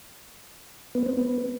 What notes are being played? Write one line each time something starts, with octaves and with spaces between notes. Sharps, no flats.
B3
C4
B3